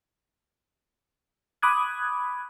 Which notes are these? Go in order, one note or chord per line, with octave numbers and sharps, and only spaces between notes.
B5 D6 D#6 F#6 G#6